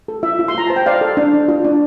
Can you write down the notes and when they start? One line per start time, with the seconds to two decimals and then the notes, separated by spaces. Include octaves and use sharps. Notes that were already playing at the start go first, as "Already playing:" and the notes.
0.08 A4
0.23 F4 E5
0.39 F4
0.48 C6
0.55 F4 A#5
0.67 C5 A5
0.76 G5
0.86 C5 D5 F5
1.01 A4
1.17 D4
1.34 D4
1.48 F4
1.65 D4